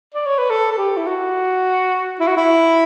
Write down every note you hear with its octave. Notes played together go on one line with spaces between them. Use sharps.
D5
C#5
B4
A4
A4
G4
E4
F#4
E4
F#4
E4